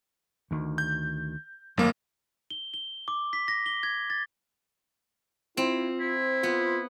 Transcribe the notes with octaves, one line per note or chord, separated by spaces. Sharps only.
D2 D#3
G6
G#1 F#2 F#3 A3 A#3
G7
G7
D6
B6
A#6
G7
G#6
A6
C4 E4 F4
E4 C5
B3 F4